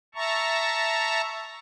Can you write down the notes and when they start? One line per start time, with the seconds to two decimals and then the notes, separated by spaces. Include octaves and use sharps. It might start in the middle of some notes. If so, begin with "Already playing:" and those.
0.15 E5 A5 A#5 C#6